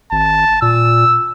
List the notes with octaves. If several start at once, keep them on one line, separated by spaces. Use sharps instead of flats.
G#1 A5
A#2 E6